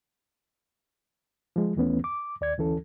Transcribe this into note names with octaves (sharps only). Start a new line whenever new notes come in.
F3 G#3
D#2 E3 A3 B3 C#4
D6
D#2 D5 G#6
D2 E3 C#4 A4